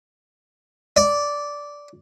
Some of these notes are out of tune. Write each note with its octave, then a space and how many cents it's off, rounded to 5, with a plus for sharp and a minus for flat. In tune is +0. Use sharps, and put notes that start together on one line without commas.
D5 -10